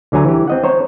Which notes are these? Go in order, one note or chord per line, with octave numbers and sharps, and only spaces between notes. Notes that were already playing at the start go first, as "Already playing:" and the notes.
D2 D3 F#3 G#5 A#5
E3 G4
C4 D#5 F#5
C5 C#5 A#5